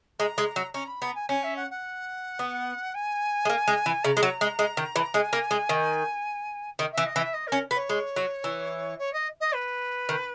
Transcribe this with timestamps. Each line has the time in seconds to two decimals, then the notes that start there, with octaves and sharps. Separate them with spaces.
0.19 G#3 A#5
0.38 G#3
0.56 F#3
0.74 C#4 A#5
0.87 B5
1.01 B3 A#5
1.15 G#5
1.29 C#4 G#5
1.43 E5
1.56 F#5
1.71 F#5
2.39 B3
2.94 G#5
3.45 G#3
3.49 A#3
3.68 G#3
3.86 E3
4.04 C#3 A#5
4.17 G#3
4.23 F#3
4.41 G#3
4.59 G#3
4.77 D#3
4.96 E3
5.14 G#3 G#5
5.33 A#3
5.51 G#3
5.69 D#3
6.79 D#3
6.92 E5
6.98 E3
7.06 D#5
7.16 E3
7.20 E5
7.33 D#5
7.47 C#4 A#4
7.71 B3
7.75 C#5
7.89 G#3
8.16 F#3
8.44 E3
8.98 C#5
9.13 D#5
9.40 D#5
9.54 B4
10.09 D#3